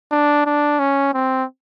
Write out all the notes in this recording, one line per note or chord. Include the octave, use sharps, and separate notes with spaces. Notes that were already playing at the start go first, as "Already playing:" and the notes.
D4
D4
C#4
C4